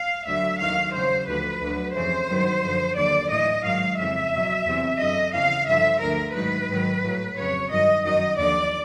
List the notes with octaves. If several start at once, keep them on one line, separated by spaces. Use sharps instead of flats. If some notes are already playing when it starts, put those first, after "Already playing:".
Already playing: F5
D2 D3 F#3 E5
D#2 D#3 F#3 F5
E2 C#3 F#3 C5
D2 D3 F3 B4
D2 D3 F#3
F2 C#3 E3 C5
G2 D#3 F#3
F#2 D3 F3
D#2 D3 F#3 D5
A2 E3 D#5
G#2 D#3 F#3 F5
F2 C#3 E3 E5
E2 B2 F#3
E2 C3 E3
F#2 D3 F#3 D#5
E2 C#3 E3 F5
G2 D3 F3 E5
D2 D3 F3 A#4
G#2 D#3 F#3 B4
G#2 D#3 F#3
A2 F#3
F2 C#3 F#3 C#5
G2 D#3 F#3 D#5
F#2 D#3 F#3 D#5
D#2 D3 F3 D5